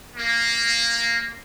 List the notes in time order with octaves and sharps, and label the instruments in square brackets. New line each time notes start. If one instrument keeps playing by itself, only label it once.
[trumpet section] A#3